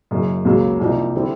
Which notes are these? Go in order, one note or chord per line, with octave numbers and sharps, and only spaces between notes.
F#1 F#2 C#3
C#2 C#3 F#3 A#3
C2 C3 F3 A#3 D#4
D3 G3 C4 E4